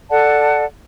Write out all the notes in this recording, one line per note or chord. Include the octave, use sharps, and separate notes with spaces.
A4 D5 F#5 A5